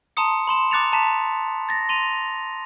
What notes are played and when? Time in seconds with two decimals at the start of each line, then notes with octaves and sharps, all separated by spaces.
0.17 A5 A#5 C6 D#6 C#7
0.47 B5 C6 E7
0.71 A#5 D6 F#6 A6 C#7 F7
0.93 A5 A#5 B6
1.69 A6 A#6
1.89 C6 D#7 F7